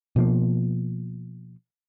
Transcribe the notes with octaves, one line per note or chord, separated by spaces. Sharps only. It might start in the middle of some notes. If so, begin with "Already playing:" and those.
B2 F3 A#3